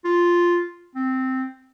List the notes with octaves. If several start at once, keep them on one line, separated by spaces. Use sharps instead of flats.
F4
C4